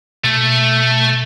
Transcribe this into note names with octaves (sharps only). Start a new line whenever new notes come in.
B2 A3